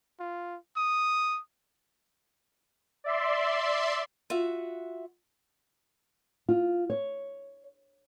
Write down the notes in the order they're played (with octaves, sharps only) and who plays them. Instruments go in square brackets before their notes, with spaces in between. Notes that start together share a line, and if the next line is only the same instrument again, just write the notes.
[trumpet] F4
D#6
[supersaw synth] D5 E5 C6
[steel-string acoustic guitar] F4 F#4 E5 F#5
[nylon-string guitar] F4
C#5